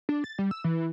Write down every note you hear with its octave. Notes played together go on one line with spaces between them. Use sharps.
D4
A6
G3
E6
E3